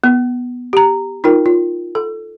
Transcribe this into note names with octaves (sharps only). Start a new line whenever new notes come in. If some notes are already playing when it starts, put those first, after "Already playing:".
B3
G4 A#5
D#4 F4 A#4 G5
F4
A4